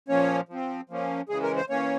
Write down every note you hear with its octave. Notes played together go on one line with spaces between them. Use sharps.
A#2 F3 A#3 C#4 C#5
F3 C4
F3 A#3 C#4
C#3 E3 G#3 G#4
A#4
C5
E3 A#3 C#4 C#5